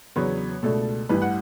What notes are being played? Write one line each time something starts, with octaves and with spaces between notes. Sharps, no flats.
E2 C#3 F#3 B3 D4 C#5
C#2 B2 A3 D4 A4
A1 G2 E3 B4
F#5